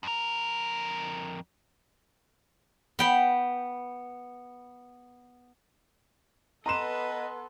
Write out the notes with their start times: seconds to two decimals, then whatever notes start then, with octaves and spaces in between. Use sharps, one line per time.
0.03 F2 A#4
2.99 B3 G5 B5
6.66 B3 A4 B4 D#5 A#5 C6 E7